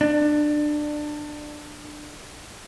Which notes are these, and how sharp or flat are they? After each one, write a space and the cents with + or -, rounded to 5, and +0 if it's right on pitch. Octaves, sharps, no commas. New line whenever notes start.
D4 +20